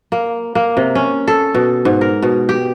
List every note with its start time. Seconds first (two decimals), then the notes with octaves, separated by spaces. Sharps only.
0.12 A#3
0.55 A#3
0.77 C3
0.95 C#4
1.28 A4
1.55 B2
1.85 G#2
2.01 A#4
2.22 B2
2.49 G4